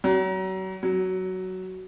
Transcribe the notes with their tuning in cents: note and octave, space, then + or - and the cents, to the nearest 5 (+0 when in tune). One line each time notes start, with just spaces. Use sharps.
F#3 +35
F#3 +10